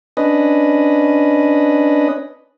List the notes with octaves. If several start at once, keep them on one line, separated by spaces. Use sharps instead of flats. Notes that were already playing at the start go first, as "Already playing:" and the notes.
C#4 D4 B4 D#5